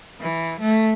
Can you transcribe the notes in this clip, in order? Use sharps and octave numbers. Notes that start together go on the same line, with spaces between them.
E3
A3